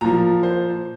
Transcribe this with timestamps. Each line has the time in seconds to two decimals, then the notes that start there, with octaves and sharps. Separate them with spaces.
0.01 A#2 F3 A#5
0.43 C5